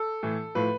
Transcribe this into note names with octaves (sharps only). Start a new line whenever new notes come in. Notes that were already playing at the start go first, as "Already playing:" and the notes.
Already playing: A4
A2 E3
A2 F3 B4